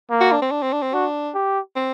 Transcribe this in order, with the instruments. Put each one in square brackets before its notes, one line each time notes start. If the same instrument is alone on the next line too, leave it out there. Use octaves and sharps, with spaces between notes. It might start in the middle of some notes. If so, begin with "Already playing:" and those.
[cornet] A#3
[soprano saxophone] F#4
D4
C4
D4
C4
D4
C4
[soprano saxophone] D4 [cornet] F#4
[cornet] G4
[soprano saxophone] C4